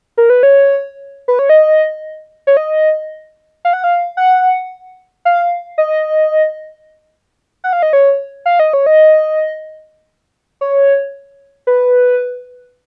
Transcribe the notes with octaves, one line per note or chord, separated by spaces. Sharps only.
A#4
B4
C#5
B4
C#5
D#5
C#5
D#5
F5
F#5
F5
F#5
F5
D#5
F#5
F5
D#5
C#5
F5
D#5
C#5
D#5
C#5
B4